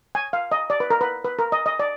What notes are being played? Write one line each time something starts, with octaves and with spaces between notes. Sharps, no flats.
G#5
F5
D#5
D5
B4
A#4
B4
B4
A#4
D#5
D#5
D5